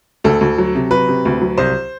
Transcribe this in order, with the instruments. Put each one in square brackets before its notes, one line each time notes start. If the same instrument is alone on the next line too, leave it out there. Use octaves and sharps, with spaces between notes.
[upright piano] D2 A4
D2
F#3
C3
F#3 B4
C3
D2
F#3
C2 C5